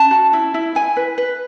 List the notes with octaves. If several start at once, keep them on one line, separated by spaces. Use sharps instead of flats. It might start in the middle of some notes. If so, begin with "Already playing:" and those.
Already playing: C#4 A5
F#4
E4
E4
E4 G#5
B4
B4